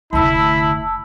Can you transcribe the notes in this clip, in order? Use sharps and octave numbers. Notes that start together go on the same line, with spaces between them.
F1 D2 E4 A5 B5 E6